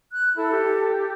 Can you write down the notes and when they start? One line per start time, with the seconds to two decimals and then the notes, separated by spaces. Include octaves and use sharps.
0.12 F#6
0.37 E4 A4
0.52 G4